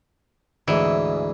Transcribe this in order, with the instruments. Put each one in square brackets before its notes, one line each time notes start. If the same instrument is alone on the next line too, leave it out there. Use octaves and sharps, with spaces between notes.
[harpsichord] D2 G#2 [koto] E3